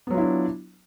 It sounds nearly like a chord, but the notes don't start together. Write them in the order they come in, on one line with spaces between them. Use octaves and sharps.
B3 F#3 F4 E4 D4